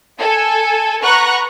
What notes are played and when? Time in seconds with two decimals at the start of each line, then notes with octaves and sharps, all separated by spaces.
0.19 A4 G#5
1.02 B4 F#5 A#5 C#6 F#6